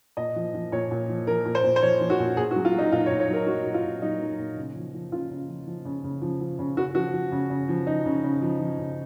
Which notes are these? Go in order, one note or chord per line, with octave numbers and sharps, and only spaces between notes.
A#2 D#5
F3
F3
A#2 C#5
A#2
F3
F3 A#4
A#2
C5
A#2
C5
F3 C#5
F3
F#4
A#2
A#2 G#4
F#4
F#3
F4
F#3 D#4
A#2 F4
C#5
A#2
C#5
F#3 A#4
F#3 F#4
A#2
F4
A#2
F#3 D#4
F#3
A#2
C#3
F3
F3
C#3 F4
C#3
F3
F3
C#3
C#3
F3
F3
C#3
C#3 F#4
F3 F#4
F3
C#3
C#3
F3
F3 D#4
C#3
C#3
F3
F3
C#3